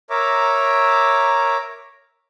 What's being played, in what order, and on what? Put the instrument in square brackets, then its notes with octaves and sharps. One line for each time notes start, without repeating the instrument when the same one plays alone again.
[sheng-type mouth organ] A#4 C#5 E5 A#5 D6